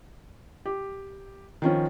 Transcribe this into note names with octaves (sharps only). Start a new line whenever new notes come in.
G4
D#3 F3 C#4